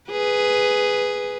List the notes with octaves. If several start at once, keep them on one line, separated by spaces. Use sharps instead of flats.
G#4 B4